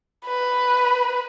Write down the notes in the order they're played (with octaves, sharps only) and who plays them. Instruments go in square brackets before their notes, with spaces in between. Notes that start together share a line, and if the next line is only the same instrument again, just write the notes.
[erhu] B4